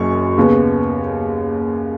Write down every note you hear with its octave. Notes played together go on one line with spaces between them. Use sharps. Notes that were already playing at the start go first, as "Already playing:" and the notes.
Already playing: F#1 F#2 F#3 C#4 C#6
D#2 C#3 B3